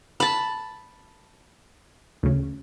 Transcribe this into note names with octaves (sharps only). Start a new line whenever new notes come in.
A5 B5
D2 C#3